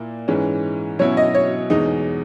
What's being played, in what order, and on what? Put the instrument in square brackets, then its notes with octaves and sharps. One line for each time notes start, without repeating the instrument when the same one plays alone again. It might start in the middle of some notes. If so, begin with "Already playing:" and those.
Already playing: [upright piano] A#2 A#3 E4
G#2 E3 G#3 C#4
[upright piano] B2 F#3 C#4 E4 [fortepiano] C#5
[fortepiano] D#5
C#5
[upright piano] E2 B2 G#3 [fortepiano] D#4